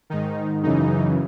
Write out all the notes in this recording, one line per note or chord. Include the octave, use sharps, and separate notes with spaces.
G#2 D#3 D#4
F#2 C#3 E3 D#4